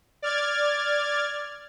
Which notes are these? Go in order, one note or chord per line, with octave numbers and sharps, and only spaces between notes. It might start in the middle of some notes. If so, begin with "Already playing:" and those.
D5 F6 G#6 A6